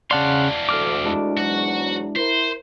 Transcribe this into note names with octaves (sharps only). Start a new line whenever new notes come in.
E2 C#3 D5 F5 F#5 A5 C6
D2 D6 F6
G#3 D4 E4
E2 G#2 F#3 F#4
E4 A#4 C5